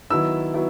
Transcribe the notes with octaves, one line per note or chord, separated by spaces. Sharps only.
D#3 F#3 B3 E4 E6
F#3 B3 E4